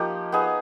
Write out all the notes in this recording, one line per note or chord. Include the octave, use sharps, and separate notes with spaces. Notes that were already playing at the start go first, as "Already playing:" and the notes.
Already playing: F3 A#3 D#4 G4
B3 D#4 G#4